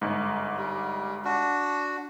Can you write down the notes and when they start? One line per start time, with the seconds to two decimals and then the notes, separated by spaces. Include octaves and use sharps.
0.02 G1 G#2
0.57 G3
1.25 D4 F#4